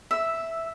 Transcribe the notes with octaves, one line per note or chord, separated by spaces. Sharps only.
E5